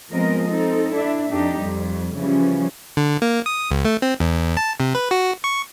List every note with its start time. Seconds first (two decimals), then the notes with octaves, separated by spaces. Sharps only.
0.12 F3 G#3 B3 C4 A#4 D#5
0.49 C4 D#4 A4
0.95 D4 E4 E5
1.31 F2 D4 D#4 G4
1.60 F2 G3
2.17 C#3 E3 F3 G3 C#4
2.97 D3
3.22 A#3
3.46 D#6
3.71 C#2
3.85 A3
4.02 C4
4.20 E2
4.57 A5
4.80 C3
4.95 B4
5.11 F#4
5.44 C#6